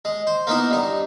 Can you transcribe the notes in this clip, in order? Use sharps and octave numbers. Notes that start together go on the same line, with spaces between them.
G#3
C5
A#3 B3 D#4 E4
G2 D#4